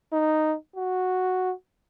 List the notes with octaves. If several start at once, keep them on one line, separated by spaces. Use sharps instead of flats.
D#4
F#4